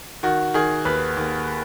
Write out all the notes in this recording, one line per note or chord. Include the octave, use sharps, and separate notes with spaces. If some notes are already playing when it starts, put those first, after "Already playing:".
D#3 F#4
D#3 G#4
D#2 B4
D#2